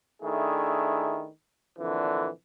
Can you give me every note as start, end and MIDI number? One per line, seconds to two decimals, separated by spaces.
0.22 1.27 51
0.22 1.27 57
0.22 1.27 62
0.22 1.27 64
0.22 1.27 68
1.79 2.28 41
1.79 2.28 46
1.79 2.28 50
1.79 2.28 52